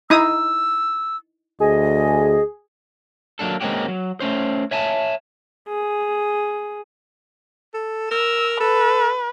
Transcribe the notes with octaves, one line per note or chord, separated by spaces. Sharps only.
D#4 E4 D#6 E6
D2 G#4 D#5
F#3 G#3 A#3 D4 A4
G#3 A#3 C4 C#4 F#4 G4
F#3
A3 C#4 C5
C#5 E5 G#5 A5
G#4
A4
A#4 E6
A4 B4